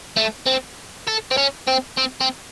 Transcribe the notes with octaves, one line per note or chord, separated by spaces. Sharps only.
A3
C4
A4
C4
C#4
C4
C4
C4